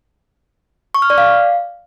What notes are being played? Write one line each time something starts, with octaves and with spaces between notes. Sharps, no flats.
C#6
F6
D5
F5